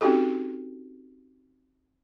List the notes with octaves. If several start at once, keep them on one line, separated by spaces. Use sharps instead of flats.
C4 C#4 D#4 F#4 G4 A4